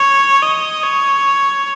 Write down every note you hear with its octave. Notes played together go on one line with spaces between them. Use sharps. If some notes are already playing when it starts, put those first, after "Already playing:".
Already playing: C#5
D#5
C#5